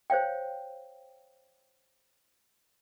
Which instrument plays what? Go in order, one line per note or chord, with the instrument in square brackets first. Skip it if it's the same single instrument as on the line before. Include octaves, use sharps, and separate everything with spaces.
[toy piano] C5 C#5 F5 G5